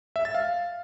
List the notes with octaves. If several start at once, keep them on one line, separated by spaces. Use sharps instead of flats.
E5
A6
F5